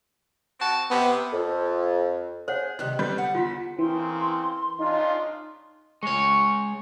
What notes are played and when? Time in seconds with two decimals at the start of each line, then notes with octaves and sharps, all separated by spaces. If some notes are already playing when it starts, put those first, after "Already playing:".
0.59 C4 F#4 A5
0.90 C3 B3
1.33 F2
2.48 G#4 C5 C#5 F#5
2.79 C3 D#3 G3 F#6
2.99 D3 G3 B3 D5 B5 G6
3.18 F#5
3.35 E2 F4 C6 B6
3.79 C#3 E3 A#3 C4 C6
4.80 C#3 D4 D#4 F4
6.03 G#3 C#5 C#6